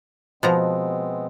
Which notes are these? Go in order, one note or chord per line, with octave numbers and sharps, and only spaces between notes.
B2 F3 G#3 B3 C4 A#5